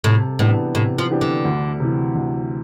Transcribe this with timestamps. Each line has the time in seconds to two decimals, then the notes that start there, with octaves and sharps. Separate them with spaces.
0.04 A2 C3
0.39 A2 E3 B3 D4 G4
0.75 A2 C3
0.98 F3
1.10 E3 B3 D4 G4
1.21 D3
1.45 D2
1.80 C3 E3
2.15 D2